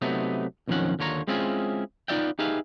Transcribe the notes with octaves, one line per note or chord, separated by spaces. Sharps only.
C3 F#3 A3 B3 D#4
B1 F2 D#3 F3 C#4 F#5
D#2 D3 F4 C#5 A#5
G#3 C4 C#4 E4 F4 G#4
B3 D#4 F4 D5 E5 G5
D#4 G4 G#4 B4 E5 F5